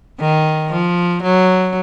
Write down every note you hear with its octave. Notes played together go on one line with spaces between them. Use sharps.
D#3
F3
F#3